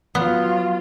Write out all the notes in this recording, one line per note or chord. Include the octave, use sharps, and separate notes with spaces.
F#3 B3 F4